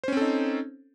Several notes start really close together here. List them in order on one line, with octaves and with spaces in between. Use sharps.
C5 C#4 C4 A4 D#4